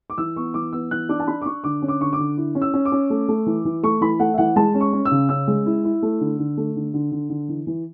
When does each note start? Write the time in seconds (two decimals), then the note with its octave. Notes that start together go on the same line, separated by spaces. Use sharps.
0.10 D6
0.18 E3 E6
0.36 B3 C#6
0.54 E3 D6
0.73 B3 E6
0.91 E3 F#6
1.09 D4 D6
1.20 A5
1.27 D4 B5
1.42 D6
1.46 D4 C#6
1.64 D3 D6
1.82 C#4
1.88 D6
2.01 D3 C#6
2.13 D6
2.19 D3
2.37 E4
2.55 C#4
2.62 E6
2.74 C#4
2.85 D6
2.92 C#4
3.10 A3
3.28 A3
3.46 E3
3.65 E3
3.83 A3 C#6
4.01 E3 B5
4.19 A3 F#5
4.34 E5
4.38 E3 F#5
4.56 G#3 A5
4.74 C#4
4.81 C#6
4.93 C#4
5.05 E6
5.11 C#3
5.29 C#4 E6
5.48 G#3
5.66 E4
5.84 E4
6.02 A3
6.21 D3
6.39 D3
6.57 A3
6.76 D3
6.94 D3
7.12 D3
7.30 D3
7.49 E3
7.67 E3